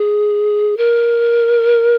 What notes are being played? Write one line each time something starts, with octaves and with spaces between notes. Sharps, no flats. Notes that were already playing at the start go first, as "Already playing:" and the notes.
Already playing: G#4
A#4